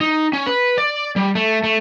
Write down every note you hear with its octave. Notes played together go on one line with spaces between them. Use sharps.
D#4
C#4
B4
D5
G3
A3
A3